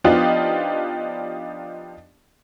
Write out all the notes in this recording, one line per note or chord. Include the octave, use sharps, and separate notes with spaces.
F3 B3 D4 D#4 F4 G4